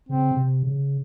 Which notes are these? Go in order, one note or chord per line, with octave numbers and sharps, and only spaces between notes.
C#3 C4
C3
C#3